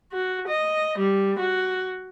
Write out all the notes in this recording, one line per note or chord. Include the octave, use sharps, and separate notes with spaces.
F#4
D#5
G3
F#4